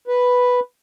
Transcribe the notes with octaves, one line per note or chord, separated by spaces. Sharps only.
B4